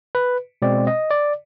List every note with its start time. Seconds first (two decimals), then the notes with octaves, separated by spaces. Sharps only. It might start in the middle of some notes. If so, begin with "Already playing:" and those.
0.15 B4
0.62 B2 G#3 C4 D5
0.87 D#5
1.11 D5